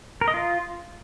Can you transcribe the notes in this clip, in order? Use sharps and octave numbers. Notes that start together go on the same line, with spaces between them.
A#4
D#5
F4